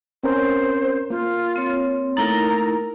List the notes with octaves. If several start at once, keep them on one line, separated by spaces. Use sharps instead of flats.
C4 C#4 A#4 C5
A#3 F4
C4 C#5
A3 A#3 D#4 E4 A#4 A#5 A6